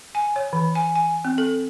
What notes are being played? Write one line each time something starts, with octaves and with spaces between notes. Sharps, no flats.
G#5
C#5
E3
G#5
G#5
C4
A4